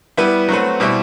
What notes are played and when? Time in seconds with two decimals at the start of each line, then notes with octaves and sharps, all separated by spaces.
0.17 G3 B3 E4 B4
0.49 F#3 A3 C4 F#4 B4
0.80 B2 G3 C4 E4